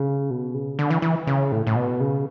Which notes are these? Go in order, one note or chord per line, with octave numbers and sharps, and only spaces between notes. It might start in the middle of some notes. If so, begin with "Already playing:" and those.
Already playing: C#3
B2
C#3
D3
E3
E3
C#3
A2
A2
B2
C#3